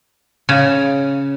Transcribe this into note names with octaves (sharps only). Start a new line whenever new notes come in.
C#3